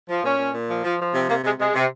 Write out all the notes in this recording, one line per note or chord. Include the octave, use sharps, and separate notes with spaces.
F3
A#2 C#4
A#2
A#2
F3
F3
F3
C3 C4
C3 A#3
C3 G#3
C3 G#3
C3